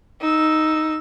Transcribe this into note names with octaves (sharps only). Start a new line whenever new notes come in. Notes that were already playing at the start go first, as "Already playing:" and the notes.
D#4 E6